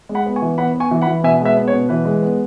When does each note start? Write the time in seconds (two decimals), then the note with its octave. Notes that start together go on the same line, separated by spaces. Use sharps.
0.09 G#3
0.15 F#5 B5
0.26 B3
0.36 G#5 C#6
0.42 E3
0.58 B3 F#5 B5
0.74 B3
0.80 G#5 C#6
0.91 E3
1.02 F#5 B5
1.07 E3
1.24 B2 E5 G#5
1.41 G#3 B4 E5
1.57 B3
1.68 C#5
1.73 B2
1.89 E3 B4
2.05 G#3
2.22 B3